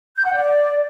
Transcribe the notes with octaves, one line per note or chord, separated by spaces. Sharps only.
G6
F#5
D5